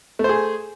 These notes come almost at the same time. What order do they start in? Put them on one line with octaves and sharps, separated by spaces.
A3 C5 G#4